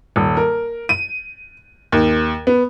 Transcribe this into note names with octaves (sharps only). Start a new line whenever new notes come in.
D#1
A#4
D#7
D#2
B3